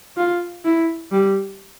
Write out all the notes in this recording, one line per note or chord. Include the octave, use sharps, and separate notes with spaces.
F4
E4
G3